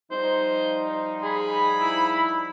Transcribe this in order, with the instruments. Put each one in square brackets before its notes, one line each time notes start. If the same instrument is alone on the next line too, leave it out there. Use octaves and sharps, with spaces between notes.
[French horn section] F3 G3 D#4 [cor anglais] C5
[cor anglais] G#4 [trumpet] B5
[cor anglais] E4